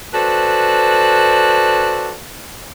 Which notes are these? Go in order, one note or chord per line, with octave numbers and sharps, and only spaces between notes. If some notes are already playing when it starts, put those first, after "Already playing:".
F#4 A4 B4 C5 D5